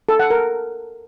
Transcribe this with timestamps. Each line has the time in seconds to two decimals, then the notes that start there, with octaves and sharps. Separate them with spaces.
0.09 A4
0.19 F#5
0.30 A#4